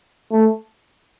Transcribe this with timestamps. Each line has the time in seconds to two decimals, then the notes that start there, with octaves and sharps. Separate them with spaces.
0.31 A3